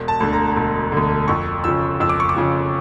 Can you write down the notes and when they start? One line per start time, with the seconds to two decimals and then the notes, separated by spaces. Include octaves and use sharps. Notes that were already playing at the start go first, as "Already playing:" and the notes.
Already playing: E1
0.08 A5
0.20 D2 D3
0.33 A#5
0.57 E1
0.92 D2 D3
1.28 F2 C#6
1.64 C#3 F3 E6
2.00 F2 E6
2.09 D6
2.20 C#6
2.29 D6
2.36 C#3 F3